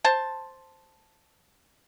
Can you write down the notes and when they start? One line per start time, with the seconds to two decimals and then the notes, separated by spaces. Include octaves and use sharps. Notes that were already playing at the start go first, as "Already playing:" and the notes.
0.04 C5 A5